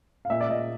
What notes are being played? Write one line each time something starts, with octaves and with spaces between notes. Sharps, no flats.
F5
A#2 E5
D5
A#2 D#5